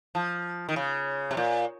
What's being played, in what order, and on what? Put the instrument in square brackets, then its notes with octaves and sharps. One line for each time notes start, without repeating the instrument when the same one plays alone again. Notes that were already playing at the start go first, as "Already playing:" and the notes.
[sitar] F3
D#3
C#3
C3
A#2